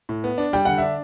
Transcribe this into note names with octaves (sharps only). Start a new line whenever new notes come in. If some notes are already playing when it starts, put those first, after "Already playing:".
A2
B3
D4
G3 G5
D3 F#5
D4 E5